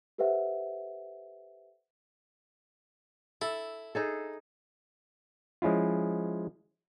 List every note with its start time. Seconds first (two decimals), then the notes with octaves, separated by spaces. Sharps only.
0.18 G4 A4 B4 C5 E5 F#5
3.42 E4 A4
3.95 D#4 G#4 A4
5.62 F3 G#3 C#4 E4 F4